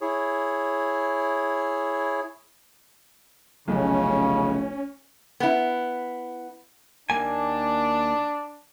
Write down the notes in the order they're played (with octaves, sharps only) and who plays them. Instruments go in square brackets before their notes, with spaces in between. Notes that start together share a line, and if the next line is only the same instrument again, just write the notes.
[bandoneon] E4 G#4 C#5
[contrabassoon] F1 [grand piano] B1 [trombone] C#3 [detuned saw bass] C#4
[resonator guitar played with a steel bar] B3 E4
[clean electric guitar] D#2 A#3 G#5 [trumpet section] D4